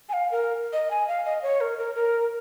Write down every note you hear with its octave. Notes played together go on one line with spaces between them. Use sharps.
G#5
F5
A#4
D#5
G#5
F5
D#5
C#5
A#4
A#4
A#4